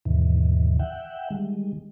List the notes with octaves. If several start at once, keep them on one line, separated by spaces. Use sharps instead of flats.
D#2 G#2 B2 D#3 E3
E5 F#5 G5
D#3 G3 G#3